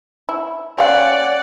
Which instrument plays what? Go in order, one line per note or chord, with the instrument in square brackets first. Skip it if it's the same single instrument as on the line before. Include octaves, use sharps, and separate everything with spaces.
[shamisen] E4
[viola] C#4 F#5 [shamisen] G4 F5 [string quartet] D5